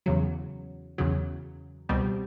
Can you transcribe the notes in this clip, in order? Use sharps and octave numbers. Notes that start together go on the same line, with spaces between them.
E2 C#3 F#3
E2 C#3 F#3
C#2 B2 G3 C4